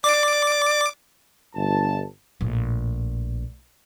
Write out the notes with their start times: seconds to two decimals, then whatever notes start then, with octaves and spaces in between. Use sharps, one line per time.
0.04 D5 D6
1.55 G1 A5
2.41 A#1 A2